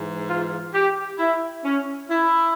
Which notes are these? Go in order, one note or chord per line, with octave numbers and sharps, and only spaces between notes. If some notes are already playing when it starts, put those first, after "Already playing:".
Already playing: G#2 E3
F4
G4
E4
C#4
E4